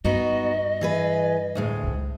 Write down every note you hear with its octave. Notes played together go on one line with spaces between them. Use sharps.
G2 B3 D#4 F#4 D#5
E3 G#4 B4
D2 A2 G#3
C#2 G#2